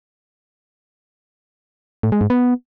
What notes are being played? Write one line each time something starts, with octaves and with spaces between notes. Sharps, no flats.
A2
G#3
G#2
B3